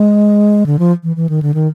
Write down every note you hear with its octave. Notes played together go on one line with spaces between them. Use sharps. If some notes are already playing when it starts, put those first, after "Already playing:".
Already playing: G#3
D3
F3
E3
E3
D#3
D3
D#3